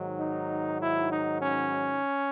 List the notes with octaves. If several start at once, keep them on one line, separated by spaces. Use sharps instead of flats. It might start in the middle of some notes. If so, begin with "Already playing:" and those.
Already playing: G#2 D#3 F#3
D#4
E4
D#4
C#4